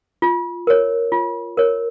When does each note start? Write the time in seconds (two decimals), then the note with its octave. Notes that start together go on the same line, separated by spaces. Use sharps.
0.22 F4
0.67 A#4 C#5
1.12 F4
1.57 A#4 C#5